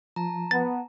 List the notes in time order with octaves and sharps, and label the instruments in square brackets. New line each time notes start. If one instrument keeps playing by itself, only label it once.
[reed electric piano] F3 [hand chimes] A5 A#5
[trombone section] B3 [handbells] A6